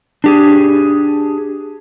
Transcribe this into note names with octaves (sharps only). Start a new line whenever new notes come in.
D4 G4 G#4